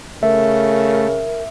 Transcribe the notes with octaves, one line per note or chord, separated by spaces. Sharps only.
C#3 A3 A#4 E5